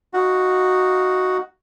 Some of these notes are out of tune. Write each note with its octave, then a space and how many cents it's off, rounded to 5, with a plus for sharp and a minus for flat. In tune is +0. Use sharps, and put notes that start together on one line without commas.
D#4 +0 F#4 +0 F5 +0